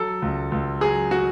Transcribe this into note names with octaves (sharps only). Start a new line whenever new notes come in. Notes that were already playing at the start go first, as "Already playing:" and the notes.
Already playing: F#3 A4
C#2
C#2
F#3 G#4
F#4